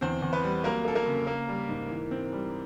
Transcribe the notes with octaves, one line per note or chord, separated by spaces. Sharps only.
E2 C4 C5
E2
B3 B4
G3
F#3 A#3 A#4
A#3
A4
A#3 A#4
C#3
A#3
G3
G#2
E3
C4
G3